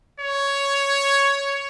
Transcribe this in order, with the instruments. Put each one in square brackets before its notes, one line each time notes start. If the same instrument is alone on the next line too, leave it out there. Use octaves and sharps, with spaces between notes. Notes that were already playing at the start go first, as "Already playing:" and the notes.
[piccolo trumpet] C#5